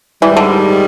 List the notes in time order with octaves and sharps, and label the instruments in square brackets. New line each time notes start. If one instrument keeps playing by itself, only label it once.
[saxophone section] G#2 D#3 G3 [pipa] E3
[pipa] D3